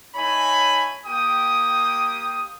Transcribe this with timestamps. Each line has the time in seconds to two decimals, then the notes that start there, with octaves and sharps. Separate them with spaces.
0.16 A3 D#4 C#5 G#5 B5
1.07 A#3 G4 G5 D#6